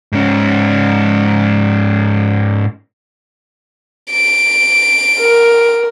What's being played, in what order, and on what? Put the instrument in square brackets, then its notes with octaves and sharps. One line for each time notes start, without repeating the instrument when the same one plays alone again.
[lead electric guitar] G#2 C#4
[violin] D7
[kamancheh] A#4